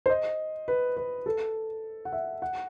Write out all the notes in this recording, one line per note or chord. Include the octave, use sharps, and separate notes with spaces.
C5
D#5
B4
B4
A4
F#5
E5
F#5